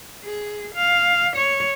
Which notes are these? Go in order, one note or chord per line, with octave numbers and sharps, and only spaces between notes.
G#4
F5
C#5